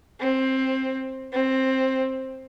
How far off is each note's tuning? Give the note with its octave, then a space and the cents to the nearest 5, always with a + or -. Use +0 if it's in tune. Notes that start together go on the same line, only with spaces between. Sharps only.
C4 +15
C4 +10